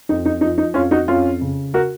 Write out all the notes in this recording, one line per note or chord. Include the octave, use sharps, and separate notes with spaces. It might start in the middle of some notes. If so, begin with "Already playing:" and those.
F2 D#4
D#4
F3 D#4
D#4
F2 C#4 F4
D#4 F#4
F2 C#4 F4
C#3
F#4 A#4